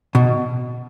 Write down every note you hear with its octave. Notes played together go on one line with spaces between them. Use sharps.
B2